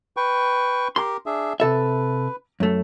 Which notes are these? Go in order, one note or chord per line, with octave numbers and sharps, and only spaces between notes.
B4 G5 C#6
G4 A#4 C6
D4 G#4 E5
C3 A4 B4 E5
F#2 A3